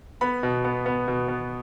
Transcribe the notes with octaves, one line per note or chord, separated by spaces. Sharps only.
B3 B5
B2
B3
B3
B2
B3